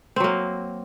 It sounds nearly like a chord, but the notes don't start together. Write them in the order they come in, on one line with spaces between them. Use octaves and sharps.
C4 F#3 A#3